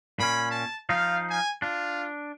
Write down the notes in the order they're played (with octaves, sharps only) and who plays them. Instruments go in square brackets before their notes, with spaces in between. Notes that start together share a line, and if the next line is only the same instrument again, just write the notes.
[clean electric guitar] A#2 C#4 [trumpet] B5
[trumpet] A5
[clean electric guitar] F3 D#4 F4 [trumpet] F5
[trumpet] G#5
[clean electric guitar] D4 [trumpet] F4